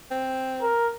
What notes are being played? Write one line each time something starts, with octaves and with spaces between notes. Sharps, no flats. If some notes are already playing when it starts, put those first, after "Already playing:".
C4
A#4